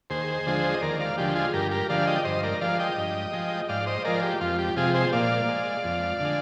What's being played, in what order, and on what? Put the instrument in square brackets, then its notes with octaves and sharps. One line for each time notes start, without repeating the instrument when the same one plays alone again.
[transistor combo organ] D#2 G#4 C5
D3 F3 G#3
D#5
D#2 A#4 D5
D5 F5
D3 F3 G#3 G4
F4 G#4
G2 G4 A#4
G4 A#4
D3 F3 G#3 D5 F5
D#5 G5
G2 C5 D#5
A#4 D5
F3 G#3 D5 F5
D#5 G5
G2
F3 G#3
G#2 D5 F5
C5 D#5
F3 G#3 A#4 D5
G4
F2 F4
G4
C3 F3 G#3 F4 G#4
G#4 C5
A#2 D5 F5
G#3
F2
D3 G#3